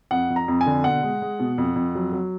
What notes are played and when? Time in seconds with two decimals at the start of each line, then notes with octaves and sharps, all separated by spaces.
0.11 F2 F#5
0.30 F2
0.36 A#5
0.48 F2
0.61 G#5
0.66 D3
0.84 B2 F#5
1.03 G#3
1.22 G#3
1.39 B2
1.58 F2
1.76 F2
1.95 F#3
2.13 F#3